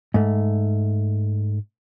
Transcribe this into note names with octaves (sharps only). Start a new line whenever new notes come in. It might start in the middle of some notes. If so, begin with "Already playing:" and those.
G#2 A3